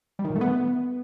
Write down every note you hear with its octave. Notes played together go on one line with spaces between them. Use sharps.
G3
D#3
A#2
A3
B3